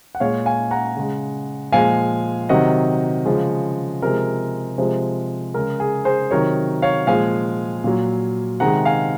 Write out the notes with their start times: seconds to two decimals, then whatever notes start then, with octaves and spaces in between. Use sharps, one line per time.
0.15 F#5
0.20 A#2 G#3 C#5 F5
0.46 F5 G#5
0.71 F#5 A#5
0.96 C#3 G#3
1.72 A#2 F3 G#3 F5 G#5
2.49 C3 D#3 F#3 D#5 F#5
3.26 C#3 F3 G#3
4.02 C3 F3 G#3 A#4
4.78 C3 F3 G#3
5.54 C#3 G#3 A#4
5.80 G#4
6.05 G#4 C5
6.31 C3 D#3 F#3 A#4 C#5
6.82 C#5 F5
7.07 A#2 F3 G#3 F5 G#5
7.84 A#2 F#3
8.60 C3 D#3 G#3 F#5 A#5
8.85 F5 G#5